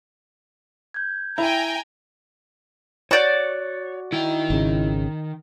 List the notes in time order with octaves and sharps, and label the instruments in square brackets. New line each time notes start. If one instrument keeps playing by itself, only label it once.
[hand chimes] G6 G#6
[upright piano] E4 [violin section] G5 G#5 A#5
[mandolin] F#4 D5 G6 [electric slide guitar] C#5
[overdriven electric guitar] D#3 G5 [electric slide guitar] E4
[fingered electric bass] G#1 C#3